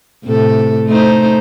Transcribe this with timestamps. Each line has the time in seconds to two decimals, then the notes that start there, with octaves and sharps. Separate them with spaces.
0.25 A2 C3 A4
0.87 A3 D#4 C5